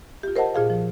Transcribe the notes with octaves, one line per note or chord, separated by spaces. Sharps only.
F4 G4
A#4 C5 D#5 F#5 A5
A#2 F4 G#4 F5
F3